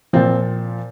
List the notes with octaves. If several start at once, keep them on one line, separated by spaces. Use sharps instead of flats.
A#2 F3 C4